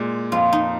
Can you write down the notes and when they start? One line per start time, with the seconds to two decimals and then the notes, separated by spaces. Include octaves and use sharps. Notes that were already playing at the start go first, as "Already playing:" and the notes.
Already playing: A#2 G#3
0.32 F2 F4
0.53 D#4